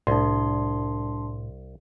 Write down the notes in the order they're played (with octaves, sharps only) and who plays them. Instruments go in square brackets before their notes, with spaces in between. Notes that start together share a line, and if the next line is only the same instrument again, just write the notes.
[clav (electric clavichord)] C2 [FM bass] A2 [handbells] D4 C6